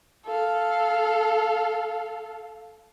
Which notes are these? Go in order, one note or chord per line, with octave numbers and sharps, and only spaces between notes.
A4 F5